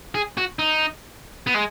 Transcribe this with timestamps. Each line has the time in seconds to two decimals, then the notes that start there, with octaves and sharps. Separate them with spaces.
0.15 G#4
0.37 F#4
0.59 D#4
1.47 B3
1.54 G#3